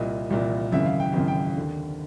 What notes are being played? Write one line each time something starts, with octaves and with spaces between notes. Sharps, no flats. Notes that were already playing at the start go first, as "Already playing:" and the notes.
Already playing: C2 A#2 D#5
C2 A#2
G#1 F#2 C#3 E3 E5
F5
G5
G#1 F#2 C#3 E3
G5
D#2 D3